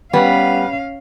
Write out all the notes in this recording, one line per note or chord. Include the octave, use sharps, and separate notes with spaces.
G3 B3 C#4 F5